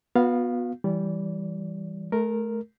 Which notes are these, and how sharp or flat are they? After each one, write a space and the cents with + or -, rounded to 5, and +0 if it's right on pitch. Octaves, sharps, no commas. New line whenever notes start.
B3 -10 F#4 -35 F5 +5
E3 +5 G3 +0 D5 -30
A3 -30 A#4 +0